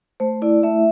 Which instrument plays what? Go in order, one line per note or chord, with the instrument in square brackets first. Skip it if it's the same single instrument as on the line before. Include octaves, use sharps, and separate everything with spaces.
[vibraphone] A3 C5
E4 D5
A3 E5